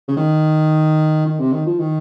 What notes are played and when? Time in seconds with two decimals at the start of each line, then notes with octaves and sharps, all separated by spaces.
0.08 C#3
0.17 D#3
1.26 D#3
1.39 C3
1.53 D#3
1.66 F3
1.80 D#3